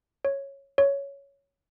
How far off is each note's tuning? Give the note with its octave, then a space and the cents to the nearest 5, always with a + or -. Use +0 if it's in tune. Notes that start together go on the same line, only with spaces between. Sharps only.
C#5 -5
C#5 +10